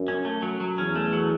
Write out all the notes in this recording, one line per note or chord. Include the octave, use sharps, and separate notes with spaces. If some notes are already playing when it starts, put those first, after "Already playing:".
Already playing: F#2
C#4
A3
F#3
F#3
E2 C#4
A3
F#3